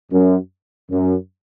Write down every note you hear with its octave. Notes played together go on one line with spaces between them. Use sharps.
F#2
F#2